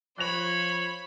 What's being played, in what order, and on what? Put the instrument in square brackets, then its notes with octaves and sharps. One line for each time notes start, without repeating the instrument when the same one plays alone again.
[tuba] F3 [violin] C5 B5 [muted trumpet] C#5 [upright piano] F#6 A#6 F7